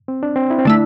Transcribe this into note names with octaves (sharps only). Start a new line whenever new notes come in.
C4
D4
C4
E4
C4
D3 A3 D4 E4